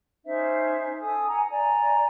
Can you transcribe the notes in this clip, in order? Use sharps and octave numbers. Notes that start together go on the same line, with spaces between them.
C#4 D#4 C5 E5
A4 G#5 D#6
F#5 G#5 A#5
D5 G#5 A#5